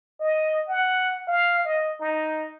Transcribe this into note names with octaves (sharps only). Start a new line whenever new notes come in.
D#5
F#5
F5
D#5
D#4